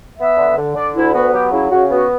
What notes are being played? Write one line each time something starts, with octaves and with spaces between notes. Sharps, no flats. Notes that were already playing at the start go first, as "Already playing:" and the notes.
B3 E5
D3
D3
D3 D5
D2 E4
B3 F#4
F#3 G4
C#3 E4
C#3 F#4
B3 F#4